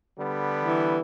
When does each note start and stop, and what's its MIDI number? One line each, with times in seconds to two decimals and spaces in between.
0.19 0.98 50
0.19 0.98 55
0.19 0.98 59
0.63 1.00 52